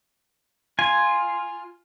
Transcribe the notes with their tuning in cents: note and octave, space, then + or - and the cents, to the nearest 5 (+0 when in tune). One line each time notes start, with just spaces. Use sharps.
F4 +0 G#5 +0